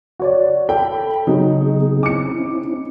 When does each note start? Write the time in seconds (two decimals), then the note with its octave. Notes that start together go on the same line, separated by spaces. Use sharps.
0.20 F#4 C#5 D5
0.69 A4 G5 B5
1.27 C#3 F#3 B3 D#4 G#4
2.03 C4 C#4 E4 D6 C#7